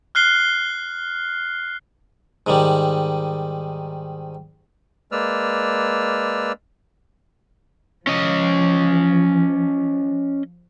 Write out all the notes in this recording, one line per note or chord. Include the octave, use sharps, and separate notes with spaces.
F6 F#6 C7 G7
G#2 D#3 G3
G#3 A#3 B4 D5 E6 F6
F3 C#4 D#5